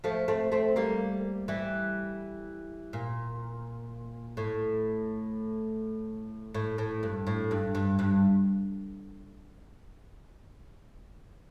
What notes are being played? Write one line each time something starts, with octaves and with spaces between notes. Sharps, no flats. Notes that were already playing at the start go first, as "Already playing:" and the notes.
F3 A3
A3 C4
A3 C4
G3 A#3
E3 G3
A#2
A2
A2
A2
G2
A2
G2
G2
G2